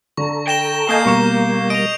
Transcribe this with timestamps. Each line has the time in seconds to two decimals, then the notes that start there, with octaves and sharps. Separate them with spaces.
0.17 D3 A4 A#5 C#6
0.48 G5 A#6 E7 G7
0.89 A#3 A4 D#5 G#5 G6 C7 G7
1.06 B2 G3 A#4 C#6 E7
1.70 D#5 D7 F7